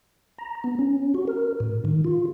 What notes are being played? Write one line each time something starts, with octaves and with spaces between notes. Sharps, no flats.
A#5
B3
C#4
F#4
A#4
A2
D#3
F4